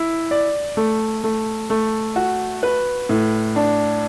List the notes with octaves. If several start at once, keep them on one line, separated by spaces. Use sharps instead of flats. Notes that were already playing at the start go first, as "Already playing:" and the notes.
Already playing: E4
D5
A3
A3
A3
F#4
B4
A2
D4